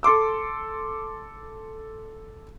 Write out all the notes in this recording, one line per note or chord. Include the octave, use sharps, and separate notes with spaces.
A4 C6 D6 E6